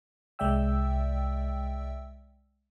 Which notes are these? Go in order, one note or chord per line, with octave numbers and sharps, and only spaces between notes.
C2 G#3 D5 E5 G5 E6